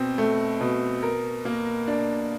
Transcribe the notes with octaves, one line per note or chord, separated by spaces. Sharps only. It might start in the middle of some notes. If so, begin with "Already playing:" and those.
Already playing: B2 C4
A3
B2
A#4
A#3
D4